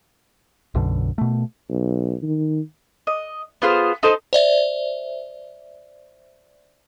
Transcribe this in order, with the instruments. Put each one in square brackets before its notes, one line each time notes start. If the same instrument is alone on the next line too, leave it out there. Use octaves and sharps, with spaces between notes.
[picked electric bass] B1 F#2 B2 D3
B2 A3
[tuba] B1
D#3
[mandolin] D#5
B3 F4 G#4 C5
D#4 A4 C5 D#5
[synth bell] C5 D5 E5